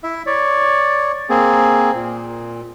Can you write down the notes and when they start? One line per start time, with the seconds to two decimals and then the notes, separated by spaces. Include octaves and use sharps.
0.03 E4 E5
0.26 C#5 D5
1.30 A#3 C4 G#4
1.95 A#2